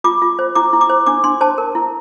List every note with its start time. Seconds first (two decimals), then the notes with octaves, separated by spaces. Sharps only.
0.04 F4 D6
0.22 F4
0.39 C5
0.55 E4 D6
0.73 E4
0.81 D6
0.90 C5
1.06 D4 D6
1.24 D4 C6
1.41 C5 A5
1.58 A#4
1.75 E4